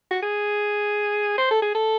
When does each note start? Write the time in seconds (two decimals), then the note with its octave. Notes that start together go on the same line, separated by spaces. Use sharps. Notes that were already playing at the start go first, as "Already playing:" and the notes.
0.11 F#4
0.22 G#4
1.38 C5
1.51 A4
1.62 G#4
1.75 A4